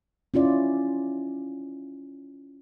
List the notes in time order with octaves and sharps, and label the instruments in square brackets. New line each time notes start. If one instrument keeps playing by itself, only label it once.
[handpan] C#4 E4 F4 D5